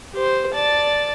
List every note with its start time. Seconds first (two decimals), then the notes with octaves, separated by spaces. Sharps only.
0.13 G4 C5
0.52 D5 A5